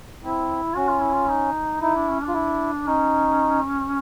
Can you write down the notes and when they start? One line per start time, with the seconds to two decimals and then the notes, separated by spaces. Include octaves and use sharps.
0.23 C4 E4
0.76 C#4 F#4
0.89 F4
1.01 E4
1.13 F4
1.29 D#4
1.81 D#4 E4
1.96 D4
2.09 C#4
2.22 D4
2.28 F4
2.34 E4
2.87 C#4 D#4